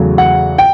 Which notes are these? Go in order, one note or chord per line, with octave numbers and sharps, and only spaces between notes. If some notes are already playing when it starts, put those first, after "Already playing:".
Already playing: E2 C#3 F#3 A3
F#5
G5